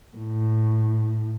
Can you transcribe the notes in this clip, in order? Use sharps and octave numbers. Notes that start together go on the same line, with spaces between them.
A2